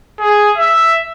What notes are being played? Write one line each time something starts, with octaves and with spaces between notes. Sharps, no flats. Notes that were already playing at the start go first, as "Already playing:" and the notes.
G#4
E5